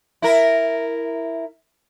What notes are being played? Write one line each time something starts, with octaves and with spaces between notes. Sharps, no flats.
E4 A#4